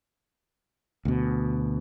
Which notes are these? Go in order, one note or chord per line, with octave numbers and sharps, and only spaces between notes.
D2 B2